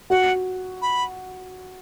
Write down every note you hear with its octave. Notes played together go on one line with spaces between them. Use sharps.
F#4 F#5
B5